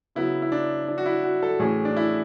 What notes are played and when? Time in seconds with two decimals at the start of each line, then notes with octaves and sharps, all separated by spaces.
0.15 C#3 F#3 B3 E4
0.42 E4
0.52 D4
0.88 D4
0.98 F#4
1.06 E4
1.24 F#4
1.43 A4
1.59 A2 E3 A3 C#4 G#4
1.85 D4
1.97 E4